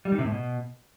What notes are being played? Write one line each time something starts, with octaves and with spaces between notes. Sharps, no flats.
G3
D#3
C3
A2
B2